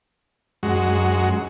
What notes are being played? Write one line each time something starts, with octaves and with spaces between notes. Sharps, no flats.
F#2 G#3 F#4